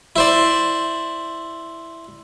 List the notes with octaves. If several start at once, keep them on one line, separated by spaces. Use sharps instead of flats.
E4 C5 D5